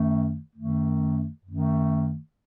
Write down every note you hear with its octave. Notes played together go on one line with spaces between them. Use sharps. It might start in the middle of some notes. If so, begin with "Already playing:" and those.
Already playing: F#2 D#3 A3
F#2 D#3 A3
F#2 D#3 A3